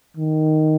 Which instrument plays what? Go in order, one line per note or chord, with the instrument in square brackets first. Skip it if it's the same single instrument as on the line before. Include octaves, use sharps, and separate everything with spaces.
[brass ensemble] D#3